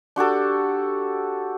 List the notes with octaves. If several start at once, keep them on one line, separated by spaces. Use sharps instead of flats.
D4 F#4 G4 A4